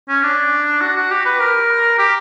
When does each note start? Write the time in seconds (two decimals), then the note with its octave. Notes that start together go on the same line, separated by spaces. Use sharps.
0.09 C#4
0.23 D4
0.81 F#4
0.96 F#4
1.11 G4
1.26 B4
1.40 A#4
1.98 G4